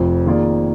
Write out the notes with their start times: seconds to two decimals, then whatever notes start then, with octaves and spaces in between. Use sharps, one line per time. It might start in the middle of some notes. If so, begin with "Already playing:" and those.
Already playing: F1 F2 F3
0.26 D#3 A#3 F4 G#4 D5